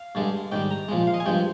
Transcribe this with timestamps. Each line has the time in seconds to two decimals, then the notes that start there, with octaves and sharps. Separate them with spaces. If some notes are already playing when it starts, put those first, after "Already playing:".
Already playing: F5
0.15 G2 D3 G#3
0.52 G#2 D#3 G3 G5
0.71 A#5
0.89 A#2 F3 G#3
1.07 F5
1.14 D#5
1.20 G#5
1.26 G2 F3 G#3 G5